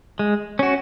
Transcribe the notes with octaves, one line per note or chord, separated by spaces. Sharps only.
G#3
C#4 F#4